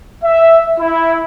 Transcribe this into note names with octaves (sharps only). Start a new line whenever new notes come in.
E5
E4